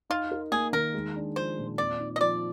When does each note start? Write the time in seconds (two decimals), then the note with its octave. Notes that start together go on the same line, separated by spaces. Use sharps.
0.10 D#4 F4
0.31 A#4
0.51 A#3 G#4
0.73 D#3 A#4
0.94 G#3
1.16 D4
1.36 F3 C5
1.58 A#2
1.78 C4 D5
2.00 D#4
2.16 D#5
2.20 F3 D5